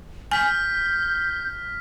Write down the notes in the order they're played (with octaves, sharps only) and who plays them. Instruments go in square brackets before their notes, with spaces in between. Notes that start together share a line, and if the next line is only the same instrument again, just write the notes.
[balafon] G#5 [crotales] F6 B6 [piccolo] G6